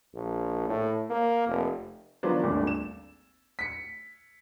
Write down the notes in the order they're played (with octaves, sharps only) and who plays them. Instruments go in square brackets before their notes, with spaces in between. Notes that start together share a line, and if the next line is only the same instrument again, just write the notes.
[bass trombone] A#1
A2
A#3
F1
[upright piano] D#3 F3 F#3 B3 D4
D#1 G#1 D2 D3 D4
E7
B6 C#7